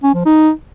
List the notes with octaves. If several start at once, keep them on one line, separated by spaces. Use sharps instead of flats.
C#4
F3
D#4